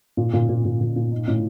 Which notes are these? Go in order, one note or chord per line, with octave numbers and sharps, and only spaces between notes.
A#2
A#2
A#2
A#2
A#2
A#2
D#4
A2